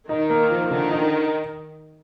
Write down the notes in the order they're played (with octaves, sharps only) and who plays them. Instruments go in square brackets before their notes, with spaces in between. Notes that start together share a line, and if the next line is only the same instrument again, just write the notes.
[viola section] D#3 [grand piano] D#4
[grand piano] A#3
F3
[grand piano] D3 [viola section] D#3
[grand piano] D#4